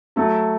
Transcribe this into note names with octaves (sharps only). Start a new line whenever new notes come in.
F#3 A3